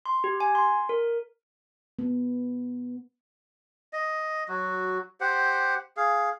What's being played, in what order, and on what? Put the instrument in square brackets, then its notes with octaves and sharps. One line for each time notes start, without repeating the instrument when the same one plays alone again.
[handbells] C6
G4
G#5
C6
A#4
[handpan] B3
[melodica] D#5
F#3 F#4
G4 C5 F#5
G#4 F5